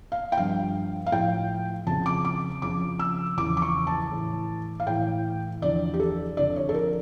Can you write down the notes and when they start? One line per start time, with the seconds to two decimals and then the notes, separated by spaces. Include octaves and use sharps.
0.12 F5
0.32 G5
0.37 G2 F3 F5
1.06 F5
1.12 A2 F3 G5
1.87 F2 C#3 F3 A5
2.06 D6
2.25 D6
2.62 F2 C#3 F3 D6
2.99 E6
3.37 E2 C#3 F3 D6
3.57 D6
3.62 C#6
3.87 A5
4.12 A2 E3
4.80 F5
4.87 A2 E3 G5
5.62 E2 D3 F3 D5
5.94 G4
6.00 A4
6.37 F2 D3 F3 D5
6.56 C#5
6.69 A4
6.74 A#4